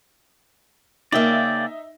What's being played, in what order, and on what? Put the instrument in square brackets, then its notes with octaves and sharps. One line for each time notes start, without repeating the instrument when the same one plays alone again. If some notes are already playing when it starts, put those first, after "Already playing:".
[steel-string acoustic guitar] C#3 A#3 [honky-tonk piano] D#4 E5 [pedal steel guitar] D5 G5